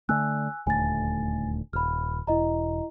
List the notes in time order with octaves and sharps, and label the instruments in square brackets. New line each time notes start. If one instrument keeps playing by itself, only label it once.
[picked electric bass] D3 A3 [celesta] G#5 E6 F#6
[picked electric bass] D#1 D2 A3 [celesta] G#5 A6
[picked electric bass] D#1 [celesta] B5 F6
[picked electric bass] E1 [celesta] E4 D#5 A#5